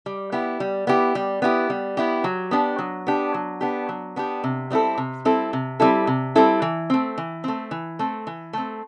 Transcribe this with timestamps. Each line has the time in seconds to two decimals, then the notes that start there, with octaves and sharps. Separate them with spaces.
0.06 G3
0.32 B3 E4 G4
0.60 G3
0.87 B3 E4 G4
1.15 G3
1.42 B3 E4 G4
1.70 G3
1.97 B3 E4 G4
2.24 F#3
2.51 B3 D4 G4
2.79 F#3
3.07 B3 D4 G4
3.34 F#3
3.61 B3 D4 G4
3.89 F#3
4.16 B3 D4 G4
4.44 C3
4.71 G3 C4 E4 A4
4.98 C3
5.25 G3 C4 E4 A4
5.53 C3
5.80 G3 C4 E4 A4
6.07 C3
6.36 G3 C4 E4 A4
6.62 E3
6.90 A3 C4
7.18 E3
7.44 A3 C4
7.71 E3
7.99 A3 C4
8.27 E3
8.53 A3 C4